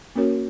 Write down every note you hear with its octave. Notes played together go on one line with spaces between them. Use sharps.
A#3 C#4 F#4 A#4 C#5